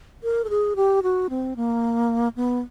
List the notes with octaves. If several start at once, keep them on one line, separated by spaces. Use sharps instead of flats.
A#4
A4
G#4
G4
F#4
C4
A#3
B3